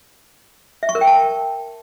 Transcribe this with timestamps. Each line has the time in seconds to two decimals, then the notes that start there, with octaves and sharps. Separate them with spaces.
0.83 E5
0.89 C#6
0.95 A#4
1.01 G5
1.07 A5